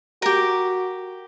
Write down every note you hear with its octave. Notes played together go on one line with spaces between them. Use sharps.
F#4 G4 A#4